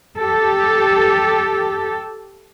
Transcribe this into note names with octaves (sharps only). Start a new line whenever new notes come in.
G4 A4